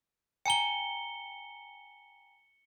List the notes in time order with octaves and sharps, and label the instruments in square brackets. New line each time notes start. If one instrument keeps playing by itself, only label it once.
[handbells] G5 G#5 A#5 [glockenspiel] C#7 G7